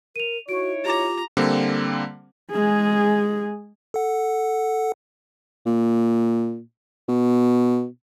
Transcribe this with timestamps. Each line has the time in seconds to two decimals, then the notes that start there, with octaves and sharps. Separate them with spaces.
0.16 A#4 D#7 F7
0.49 D#4 E4 F#4 C#5 D7
0.85 F4 G4 A#5 D6
1.37 D3 G3 A#3 C4
2.51 G#3 G#4
3.94 A4 F#5
5.66 A#2
7.08 B2